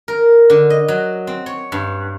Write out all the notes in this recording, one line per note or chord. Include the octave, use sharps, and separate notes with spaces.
A#4
D3
D#5
F#3
C4
C#5
G2